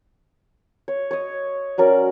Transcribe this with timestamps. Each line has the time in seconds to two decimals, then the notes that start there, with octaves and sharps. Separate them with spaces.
0.88 C#5
1.11 C#5 D#5
1.78 F#3 C#4 A#4 D5